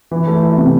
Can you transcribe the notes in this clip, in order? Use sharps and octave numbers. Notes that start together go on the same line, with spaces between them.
E3
A3
E4
C3